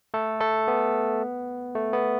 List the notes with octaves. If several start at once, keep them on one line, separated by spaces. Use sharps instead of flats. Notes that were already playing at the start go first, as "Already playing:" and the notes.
A3 A4
A3 A4
B3
A3
B3